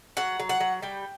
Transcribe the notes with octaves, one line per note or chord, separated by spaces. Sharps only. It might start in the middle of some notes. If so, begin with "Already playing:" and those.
F#3 F#5
F#3
F#5
F#3
G3 G5